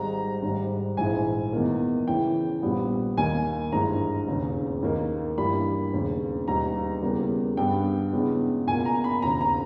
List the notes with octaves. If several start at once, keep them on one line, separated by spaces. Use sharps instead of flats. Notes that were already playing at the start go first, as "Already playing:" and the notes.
Already playing: G#1 G#2 G3 A#5
G#1 G#2 G3
A#1 G#2 E3 G#3 G#5
E2 D#3 A#3
E2 C#3 E3 G5
A#1 A#2 G3 B3
D#2 D#3 A#3 G#5
G#1 G2 E3 G#3 A#5
E1 D#2 C#3
D#2 D#3 A#3
G2 E3 G3 A#3 B5
E1 D#2 C#3
E1 D#2 D#3 G3 A#5
E2 C#3 G3 A#3
G2 G3 B3 G5
E2 C#3 G#3 B3
C#2 B2 A#3 G#5
A#5
B5
E1 D#2 C#3 A#5
A#5